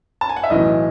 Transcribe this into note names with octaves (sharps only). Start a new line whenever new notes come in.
A5
G#5
F#5
E5
B1 A2 E3 D#5